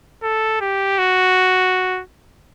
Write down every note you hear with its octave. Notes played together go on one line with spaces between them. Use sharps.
A4
G4
F#4